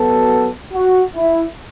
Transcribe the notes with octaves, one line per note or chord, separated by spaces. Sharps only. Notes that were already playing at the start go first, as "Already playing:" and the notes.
Already playing: B2 F#3 B3 A4
F#4
E4